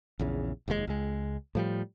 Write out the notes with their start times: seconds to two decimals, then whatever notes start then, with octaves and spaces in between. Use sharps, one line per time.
0.19 A#1 E2 C#3
0.68 F1 D#2 B2 G#3
0.87 C#2 G#3
1.55 A2 F3 G3